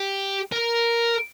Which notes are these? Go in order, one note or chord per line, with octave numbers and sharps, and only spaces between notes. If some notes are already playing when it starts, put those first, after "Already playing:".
Already playing: G4
A#4